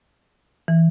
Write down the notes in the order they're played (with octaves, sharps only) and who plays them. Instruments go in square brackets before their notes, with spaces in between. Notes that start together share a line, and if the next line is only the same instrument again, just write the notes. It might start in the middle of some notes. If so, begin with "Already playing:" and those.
[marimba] E3